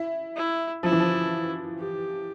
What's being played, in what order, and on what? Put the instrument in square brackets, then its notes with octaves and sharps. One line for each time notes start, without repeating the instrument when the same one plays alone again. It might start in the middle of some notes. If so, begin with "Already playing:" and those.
Already playing: [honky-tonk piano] E4
[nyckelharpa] E4
[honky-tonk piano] F3 [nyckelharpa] E4
[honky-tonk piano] E3
F3
[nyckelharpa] G4